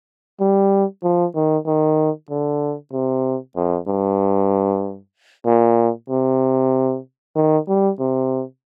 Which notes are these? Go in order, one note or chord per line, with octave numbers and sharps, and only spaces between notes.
G3
F3
D#3
D#3
D3
C3
F2
G2
A#2
C3
D#3
G3
C3